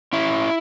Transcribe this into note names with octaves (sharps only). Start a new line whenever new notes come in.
C#4 E4